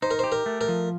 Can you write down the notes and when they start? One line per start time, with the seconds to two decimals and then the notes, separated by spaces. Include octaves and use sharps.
0.02 D#4 C5
0.11 A#4
0.19 G4 C5
0.32 A#4
0.46 A3
0.61 A#4
0.68 F3